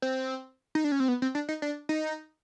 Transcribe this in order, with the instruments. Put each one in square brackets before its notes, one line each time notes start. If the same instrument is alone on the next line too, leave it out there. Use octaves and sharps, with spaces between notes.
[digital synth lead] C4
D#4
D4
C#4
C4
B3
C4
D4
D#4
D4
D#4